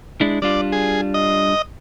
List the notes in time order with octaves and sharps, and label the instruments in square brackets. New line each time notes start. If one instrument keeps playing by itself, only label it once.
[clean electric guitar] G#3 D4 E4
[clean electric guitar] G3 D4 F4 [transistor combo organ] D5
[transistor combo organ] G#4
D#5